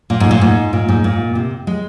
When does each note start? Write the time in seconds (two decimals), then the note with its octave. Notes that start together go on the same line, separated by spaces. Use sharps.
0.10 A#2
0.20 G#2
0.31 A#2
0.41 G#2
0.73 A#2
0.89 G#2
1.04 A#2
1.35 C3
1.67 G#3